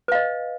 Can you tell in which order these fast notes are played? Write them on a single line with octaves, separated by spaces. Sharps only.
B4 F5 D#5